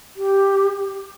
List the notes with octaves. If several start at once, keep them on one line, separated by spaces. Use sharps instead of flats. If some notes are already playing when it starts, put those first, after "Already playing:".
G4